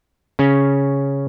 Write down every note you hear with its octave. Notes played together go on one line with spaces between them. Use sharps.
C#3 C#4